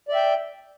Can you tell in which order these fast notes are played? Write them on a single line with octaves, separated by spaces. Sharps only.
D5 E5 G5